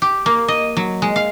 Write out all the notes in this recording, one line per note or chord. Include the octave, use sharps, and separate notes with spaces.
G4
A#3
D#5
F#3
G#3
F5